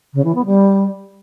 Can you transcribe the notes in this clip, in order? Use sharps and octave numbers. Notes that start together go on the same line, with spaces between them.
C#3
E3
B3
G3